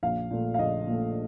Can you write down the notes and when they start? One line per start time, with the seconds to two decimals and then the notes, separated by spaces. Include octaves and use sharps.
0.03 A#1 F5
0.31 A#2 A3
0.54 F5
0.59 A#1 D#5
0.87 A#2 A3